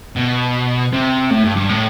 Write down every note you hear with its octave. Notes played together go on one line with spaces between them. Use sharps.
B2
C3
A2
G2
G2
A2